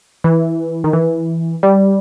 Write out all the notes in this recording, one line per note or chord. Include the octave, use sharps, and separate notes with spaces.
E3
D#3
E3
G3